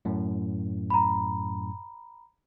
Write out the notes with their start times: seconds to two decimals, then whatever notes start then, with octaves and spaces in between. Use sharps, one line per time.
0.05 F#2 A2
0.90 A#5 B5